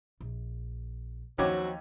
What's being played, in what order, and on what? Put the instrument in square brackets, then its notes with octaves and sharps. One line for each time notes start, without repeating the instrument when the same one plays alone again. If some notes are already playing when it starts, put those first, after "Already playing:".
[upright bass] A#1
[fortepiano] D#2 C#4 D6 [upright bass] F3 [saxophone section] F#3 C4 F#4